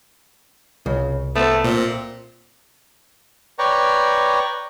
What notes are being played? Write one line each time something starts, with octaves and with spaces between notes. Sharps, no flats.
C2 C#3
A3 B3 C5
A#2 C4
B4 C#5 D5 G5 A#5 C#6